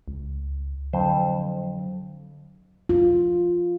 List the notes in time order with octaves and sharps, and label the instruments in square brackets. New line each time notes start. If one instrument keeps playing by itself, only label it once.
[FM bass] C#2
[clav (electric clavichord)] F2 C5 [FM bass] D3 [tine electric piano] F#3
[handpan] F4